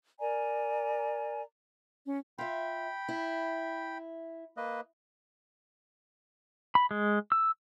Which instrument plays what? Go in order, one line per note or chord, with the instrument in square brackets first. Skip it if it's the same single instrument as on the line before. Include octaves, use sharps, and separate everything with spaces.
[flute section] A#4 D5 G#5 A#5
C#4
[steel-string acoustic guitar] F4 E5 [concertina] G5 B5
[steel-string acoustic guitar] E4
[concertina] A#3 B4 D#5
[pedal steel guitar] B5
G#3
E6